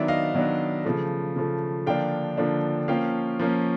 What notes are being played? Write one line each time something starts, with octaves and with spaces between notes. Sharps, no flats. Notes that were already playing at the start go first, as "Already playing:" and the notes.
Already playing: D#3 F#3 B3 D4 D5 E5
D#5 F5
D#3 F#3 B3 D4
C#3 F3 A3
C#3 F3 A3
D3 F3 A#3 D4 F5 G5
D3 F3 A#3 D4
F3 A#3 C#4 F5 G5
F3 A#3 C#4